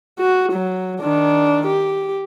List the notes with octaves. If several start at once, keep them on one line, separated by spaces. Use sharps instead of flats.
F#4
F#3
D#3 D4
G4